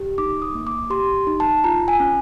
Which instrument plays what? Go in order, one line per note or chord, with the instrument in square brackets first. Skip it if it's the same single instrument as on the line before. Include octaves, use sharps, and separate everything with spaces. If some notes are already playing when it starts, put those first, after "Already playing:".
Already playing: [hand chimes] G4
D#4 D6
D#6
A#3
D6
G4 C6
D#4
A5
F4 A#5
G#5
C#4